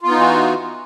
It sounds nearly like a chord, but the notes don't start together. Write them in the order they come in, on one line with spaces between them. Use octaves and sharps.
F4 B3 D#4 E3 F#4